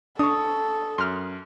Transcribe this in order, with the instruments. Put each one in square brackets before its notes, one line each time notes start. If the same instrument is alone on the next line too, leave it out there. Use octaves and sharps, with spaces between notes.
[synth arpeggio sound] D4 [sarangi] A4 [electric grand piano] C#6 D#6
[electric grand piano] F#2 [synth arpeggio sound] C6 F6